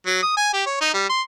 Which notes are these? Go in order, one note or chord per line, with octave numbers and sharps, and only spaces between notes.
F#3
D#6
G#5
G4
C#5
D#4
G3
C6